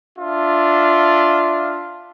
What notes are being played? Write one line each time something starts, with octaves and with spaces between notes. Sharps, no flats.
D4 F4 E5